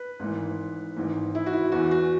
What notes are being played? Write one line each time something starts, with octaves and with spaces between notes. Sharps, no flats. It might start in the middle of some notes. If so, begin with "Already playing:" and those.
Already playing: B4
G#1 G#2 E3
G#1 G#2 E3
E4
F#4
E4
E2 E3 F#4
F#4